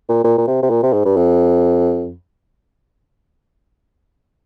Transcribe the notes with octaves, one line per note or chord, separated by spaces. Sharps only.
A#2
A#2
A#2
C3
C3
A#2
C3
G#2
G2
F2